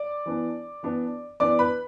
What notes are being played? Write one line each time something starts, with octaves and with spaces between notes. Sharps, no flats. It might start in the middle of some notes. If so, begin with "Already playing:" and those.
Already playing: D5 D6
E3 B3 D4
E3 B3 D4
E3 B3 D4 D5 D6
B4 B5